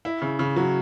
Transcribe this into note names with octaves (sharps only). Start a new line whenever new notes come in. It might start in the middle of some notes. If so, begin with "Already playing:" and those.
E4
C#3
C#3
F#3